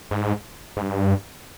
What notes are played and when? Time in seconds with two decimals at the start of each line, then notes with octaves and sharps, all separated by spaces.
0.11 G#2
0.77 G#2
0.82 G2